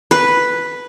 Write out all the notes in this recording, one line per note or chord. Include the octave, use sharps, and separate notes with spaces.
B4